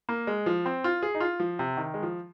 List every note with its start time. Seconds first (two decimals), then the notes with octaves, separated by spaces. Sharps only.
0.09 A#3
0.27 G#3
0.46 F3
0.66 C4
0.84 F4
1.03 G#4
1.15 D#4
1.21 F4
1.40 F3
1.59 C3
1.77 D#3
1.94 G#3
2.03 F3